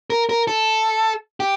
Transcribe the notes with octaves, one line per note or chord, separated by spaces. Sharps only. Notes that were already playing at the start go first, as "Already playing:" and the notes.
A#4
A#4
A4
G4